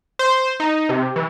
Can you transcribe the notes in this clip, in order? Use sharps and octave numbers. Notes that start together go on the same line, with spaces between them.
C5
D#4
C3
E3